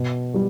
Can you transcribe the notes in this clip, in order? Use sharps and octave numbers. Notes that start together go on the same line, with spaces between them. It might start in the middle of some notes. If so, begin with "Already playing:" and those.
Already playing: B2
G3